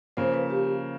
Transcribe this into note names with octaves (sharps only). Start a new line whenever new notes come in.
C#3 F3 A#3 C5
B4
G4